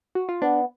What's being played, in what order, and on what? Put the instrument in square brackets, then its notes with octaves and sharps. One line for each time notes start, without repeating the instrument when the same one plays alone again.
[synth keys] F#4
F4
[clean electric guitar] B3 [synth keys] D4